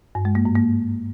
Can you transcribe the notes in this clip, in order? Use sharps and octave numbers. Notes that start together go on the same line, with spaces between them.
G2
G#3
A#3
G#2
A#3